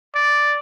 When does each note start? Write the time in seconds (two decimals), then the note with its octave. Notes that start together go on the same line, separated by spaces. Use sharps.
0.15 D5